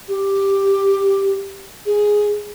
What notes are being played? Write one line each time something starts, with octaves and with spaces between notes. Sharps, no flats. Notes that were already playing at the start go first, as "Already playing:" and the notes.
G4
G#4